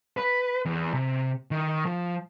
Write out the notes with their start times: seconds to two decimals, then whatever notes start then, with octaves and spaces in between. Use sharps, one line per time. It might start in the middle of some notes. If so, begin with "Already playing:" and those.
0.17 B4
0.65 E2
0.94 C3
1.51 D#3
1.86 F3